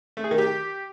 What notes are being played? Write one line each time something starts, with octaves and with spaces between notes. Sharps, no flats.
A3
G#4
D#3
G4